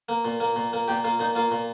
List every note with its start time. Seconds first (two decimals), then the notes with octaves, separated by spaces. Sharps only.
0.09 A#3
0.25 A#2
0.40 A#3
0.56 A#2
0.73 A#3
0.88 A#2 G4
1.04 A#3 F4
1.19 A#2 D#4
1.35 A#3 F4
1.51 A#2